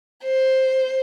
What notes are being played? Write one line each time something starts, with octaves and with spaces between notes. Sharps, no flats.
C5